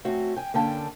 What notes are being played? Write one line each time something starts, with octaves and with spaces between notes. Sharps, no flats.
A3 C4 C#4 F#4
G5 G#5
D3 A#3 C#4 G5 A5